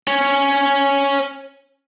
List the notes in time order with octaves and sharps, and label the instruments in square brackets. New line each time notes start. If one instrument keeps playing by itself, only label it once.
[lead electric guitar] C#4 C#5